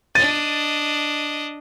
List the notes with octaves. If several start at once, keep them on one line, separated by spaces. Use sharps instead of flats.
D4 D#5 A6 D#7